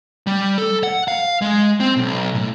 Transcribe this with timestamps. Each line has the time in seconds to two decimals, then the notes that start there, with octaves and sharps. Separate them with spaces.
0.27 G3
0.58 A4
0.83 F#5
1.08 F5
1.41 G#3
1.80 C4
1.96 B1
2.34 A2